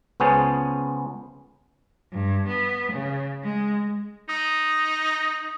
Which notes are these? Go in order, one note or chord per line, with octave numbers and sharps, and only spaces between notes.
C#2 B3 C#4 G#4 C5 A5
G2
B3
C#3
G#3
D#4 D#6